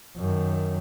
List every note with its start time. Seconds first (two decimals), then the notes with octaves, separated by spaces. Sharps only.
0.17 F#2 D#3